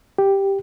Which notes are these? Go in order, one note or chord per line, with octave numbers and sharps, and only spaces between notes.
G4